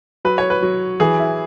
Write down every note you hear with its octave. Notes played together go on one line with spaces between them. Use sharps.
F#3 B4
C#5
B4
F#3
E3 G#4
E4